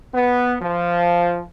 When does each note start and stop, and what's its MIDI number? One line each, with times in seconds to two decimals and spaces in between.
0.15 0.57 59
0.61 1.42 53